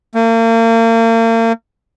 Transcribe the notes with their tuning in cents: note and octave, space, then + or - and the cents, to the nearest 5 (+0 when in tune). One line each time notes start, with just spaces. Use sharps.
A#3 -40